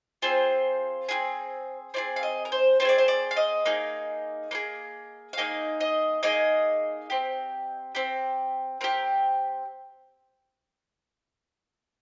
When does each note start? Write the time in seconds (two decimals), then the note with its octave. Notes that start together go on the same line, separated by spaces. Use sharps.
0.22 C4 F4 G#4 C5
1.08 C4 F4 G#4
1.94 C4 F4 G#4 D5
2.16 F5
2.23 D#5
2.45 A#4
2.52 C5
2.80 C4 F4 C5
2.85 G#4 D5
2.98 C5
3.08 D5
3.31 F5
3.37 D#5
3.66 A#3 D#4 G#4
4.51 A#3 D#4 G#4
5.33 F5
5.37 A#3 D#4 G#4 D#5
5.81 D#5
6.23 A#3 D#4 G#4 D#5
7.10 C4 G4
7.95 C4 G4
8.81 C4 G4 A#4